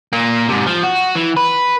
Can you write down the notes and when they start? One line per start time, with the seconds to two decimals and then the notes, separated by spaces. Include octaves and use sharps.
0.13 A#2 A#3
0.48 G#2 C3
0.66 F3
0.83 F#4
1.15 E3
1.37 B4